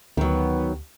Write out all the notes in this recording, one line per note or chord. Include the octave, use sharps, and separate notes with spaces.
D2 D#3 F#3 B3